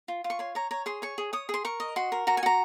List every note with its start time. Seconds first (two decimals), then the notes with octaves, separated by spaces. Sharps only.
0.08 F4
0.24 F4
0.30 C#6
0.39 C#5 C6
0.55 C#5 A#5
0.71 C#5 A#5
0.86 G#4 C6
1.02 C#5 C#6
1.18 G#4
1.33 C#5 D#6
1.49 G#4 C6
1.65 A#4 C#6
1.80 D#5
1.96 F#4 C6
2.12 A#4
2.27 F#4 A#5
2.37 G#5
2.43 F#4 A#5